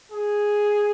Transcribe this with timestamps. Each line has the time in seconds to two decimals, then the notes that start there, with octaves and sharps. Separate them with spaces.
0.12 G#4